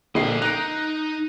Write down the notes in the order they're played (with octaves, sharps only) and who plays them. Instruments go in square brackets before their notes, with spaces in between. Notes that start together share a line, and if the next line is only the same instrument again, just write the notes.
[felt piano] A#1 A#3 C7 [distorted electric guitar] D3 D#5
[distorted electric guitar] D#4 [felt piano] F#6 D7